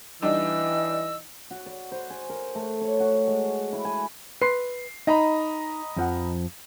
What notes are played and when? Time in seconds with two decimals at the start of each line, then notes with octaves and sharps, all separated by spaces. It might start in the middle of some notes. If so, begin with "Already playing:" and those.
0.22 E3 G3 D4 D#4 D#5 E6
1.51 F#4
1.66 D5
1.92 C5
2.10 G#5
2.29 A#4
2.55 A3
2.81 C#5
3.00 F#4
3.27 G#3
3.73 E4
3.85 G#5
4.42 B4 C6 C7
5.07 D#4 D#5 A#5 B5
5.96 F2 F3 F#5